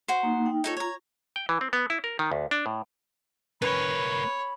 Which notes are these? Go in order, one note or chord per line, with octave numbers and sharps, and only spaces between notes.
F#4 C5
A#3 D#4
D#4 G5
D#4 F4 A4 C#5
C#5 A#5
G5
E3
C4
B3
E4
A#4
D#3
D2
D4
A2
A#3 C#4 B4 C#5 B5